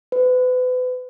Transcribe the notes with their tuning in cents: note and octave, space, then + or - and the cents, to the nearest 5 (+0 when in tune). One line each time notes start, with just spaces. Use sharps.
B4 +35